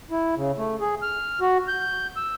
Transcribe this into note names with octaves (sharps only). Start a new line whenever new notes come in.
E4
C#3
A3
G#4
F6
F#4
G6
E6